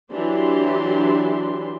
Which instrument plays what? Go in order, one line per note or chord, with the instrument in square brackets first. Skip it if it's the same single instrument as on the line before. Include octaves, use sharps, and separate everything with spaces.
[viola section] E3 F#3 D4 G4 C6